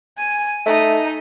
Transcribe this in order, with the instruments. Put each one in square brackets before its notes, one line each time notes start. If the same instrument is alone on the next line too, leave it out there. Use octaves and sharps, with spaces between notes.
[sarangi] G#5
[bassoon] A3 [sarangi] D#4